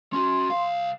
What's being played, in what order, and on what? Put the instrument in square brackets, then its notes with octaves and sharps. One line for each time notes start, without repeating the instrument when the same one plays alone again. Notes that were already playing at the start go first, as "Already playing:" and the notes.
[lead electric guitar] C#4 F#4 [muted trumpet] C6
[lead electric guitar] C2 F5